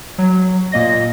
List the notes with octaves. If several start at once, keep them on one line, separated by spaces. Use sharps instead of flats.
F#3
A#2 A#3 D#5 A#6